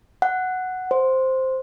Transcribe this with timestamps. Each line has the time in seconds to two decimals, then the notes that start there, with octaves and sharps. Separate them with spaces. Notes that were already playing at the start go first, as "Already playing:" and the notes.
0.22 F#5
0.91 C5